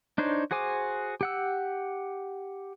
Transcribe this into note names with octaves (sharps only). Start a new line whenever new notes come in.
D4 D#4 C5 C#5
F#4 G#4 C5 G#5 D6
G4 F#5 E6